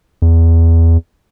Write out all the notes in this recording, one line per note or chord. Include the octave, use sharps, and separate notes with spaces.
E2